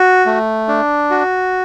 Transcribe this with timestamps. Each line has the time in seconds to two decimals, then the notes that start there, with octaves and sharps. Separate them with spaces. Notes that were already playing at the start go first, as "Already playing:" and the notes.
Already playing: F#4
0.26 A3
0.68 D4
1.10 F#4